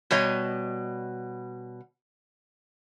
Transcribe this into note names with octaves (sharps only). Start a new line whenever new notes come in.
B2 G3 C#5 D#5